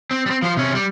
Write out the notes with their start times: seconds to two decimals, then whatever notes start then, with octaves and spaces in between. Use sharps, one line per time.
0.11 C4
0.26 G3 C4
0.42 F3 C5
0.57 C3 C#4
0.75 G3